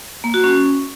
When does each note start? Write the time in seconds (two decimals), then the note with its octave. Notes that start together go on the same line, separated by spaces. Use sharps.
0.24 A#3
0.34 F#4
0.44 C#4